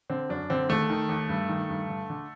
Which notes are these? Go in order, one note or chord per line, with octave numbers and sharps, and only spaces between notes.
D3 C4
F#2 D4
D3 C4
D#2 A3
D#3
D#2
G2
D#3
G2
D3
D3